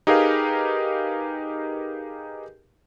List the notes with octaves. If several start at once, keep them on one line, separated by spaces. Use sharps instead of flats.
D#4 G4 G#4 A#4 B4 F5